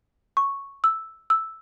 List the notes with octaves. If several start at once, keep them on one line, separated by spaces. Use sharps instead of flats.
C#6
E6
E6